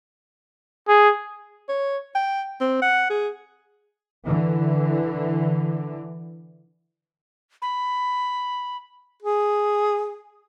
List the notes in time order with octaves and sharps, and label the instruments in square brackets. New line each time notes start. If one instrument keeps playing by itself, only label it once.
[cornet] G#4
[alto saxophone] C#5
G5
C4
F#5
G#4
[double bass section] D3 E3
[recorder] B5
[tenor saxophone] G#4